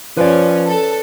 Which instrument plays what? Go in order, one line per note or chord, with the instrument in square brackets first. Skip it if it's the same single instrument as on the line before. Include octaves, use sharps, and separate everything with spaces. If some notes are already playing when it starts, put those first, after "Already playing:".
[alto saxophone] F3 [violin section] C#4 [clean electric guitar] B4 D5
[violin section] A4